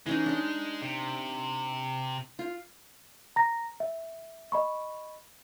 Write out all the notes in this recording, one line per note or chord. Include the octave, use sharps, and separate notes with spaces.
E3 G#3 C#4 D#4
D4 D#4
C3
F4
A#5 A#6
E5
D#5 B5 C#6